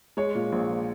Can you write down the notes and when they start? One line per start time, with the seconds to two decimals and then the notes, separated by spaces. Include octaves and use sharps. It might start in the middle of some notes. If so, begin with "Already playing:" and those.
0.17 G#3 C#5
0.35 A#2
0.52 A#1